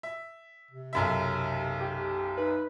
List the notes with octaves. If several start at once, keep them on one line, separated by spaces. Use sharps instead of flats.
E5
C3
B1 F#2 E5
G4
D#4 B4